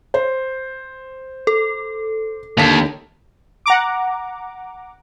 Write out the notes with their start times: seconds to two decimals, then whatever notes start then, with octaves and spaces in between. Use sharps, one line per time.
0.14 C5
1.47 A4
2.58 D#2 D3 A5 B6
3.66 F#5 A#5 D6